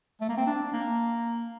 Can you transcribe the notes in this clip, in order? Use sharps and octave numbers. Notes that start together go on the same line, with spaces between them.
A3
A#3
C4
D4
A#3